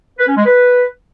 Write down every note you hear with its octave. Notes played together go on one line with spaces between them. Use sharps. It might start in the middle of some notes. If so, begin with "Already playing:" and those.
B4
C#4
G#3
B4